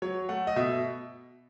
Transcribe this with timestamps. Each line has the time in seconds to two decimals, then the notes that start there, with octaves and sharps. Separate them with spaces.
0.02 F#3 C#5
0.29 A3 F#5
0.47 D#5
0.56 B2 E5